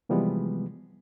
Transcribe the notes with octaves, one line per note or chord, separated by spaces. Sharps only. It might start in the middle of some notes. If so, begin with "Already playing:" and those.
C3 E3 F3 G3 G#3 B3